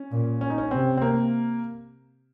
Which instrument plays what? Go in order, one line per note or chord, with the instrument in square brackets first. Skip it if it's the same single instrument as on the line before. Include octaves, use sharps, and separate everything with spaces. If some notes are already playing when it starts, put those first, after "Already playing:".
Already playing: [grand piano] C#4
[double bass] A#2
[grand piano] C#4
D#4
C#4
[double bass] C3 [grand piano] C4
[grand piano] C4
A#3